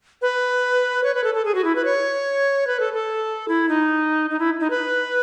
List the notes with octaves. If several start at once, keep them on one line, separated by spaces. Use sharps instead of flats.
B4
C#5
B4
A4
A4
G#4
F#4
E4
B4
C#5
B4
A4
A4
E4
D#4
D#4
E4
D#4
B4